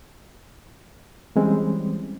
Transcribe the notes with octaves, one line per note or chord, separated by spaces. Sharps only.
E3 G3 G#3 C4 C#4